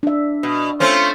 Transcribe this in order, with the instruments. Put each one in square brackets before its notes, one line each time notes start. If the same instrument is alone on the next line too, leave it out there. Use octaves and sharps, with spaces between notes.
[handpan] D4 E5
[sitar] B2
[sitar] A3 C4 C#4 [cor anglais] F4